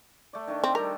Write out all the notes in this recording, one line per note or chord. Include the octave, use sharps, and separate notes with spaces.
A3 D5
D#3 A3 D4
C4
G3 G4 A4 A#4